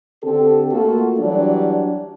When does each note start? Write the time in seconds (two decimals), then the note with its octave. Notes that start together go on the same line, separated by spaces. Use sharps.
0.24 D3 C4 G4 A4
0.72 A3 A#3 F4 F#4 A4
1.19 E3 F#3 G3 D4